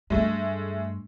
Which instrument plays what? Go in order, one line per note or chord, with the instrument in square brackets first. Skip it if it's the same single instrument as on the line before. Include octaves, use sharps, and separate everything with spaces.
[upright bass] G2 [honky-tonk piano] G#3 A3